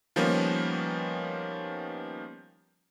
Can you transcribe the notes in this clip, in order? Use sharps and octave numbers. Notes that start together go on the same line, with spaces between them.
D#3 F3 G3 A#3 B3 C#4